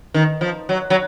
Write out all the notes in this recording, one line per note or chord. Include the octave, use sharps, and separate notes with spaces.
D#3
F3
F#3
F#3